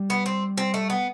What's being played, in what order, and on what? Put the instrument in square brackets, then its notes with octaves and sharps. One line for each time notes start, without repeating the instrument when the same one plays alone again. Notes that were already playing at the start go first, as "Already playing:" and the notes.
Already playing: [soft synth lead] G3
[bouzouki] B3
C4
C4
A3
B3